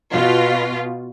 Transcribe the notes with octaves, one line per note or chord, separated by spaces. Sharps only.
B2 F4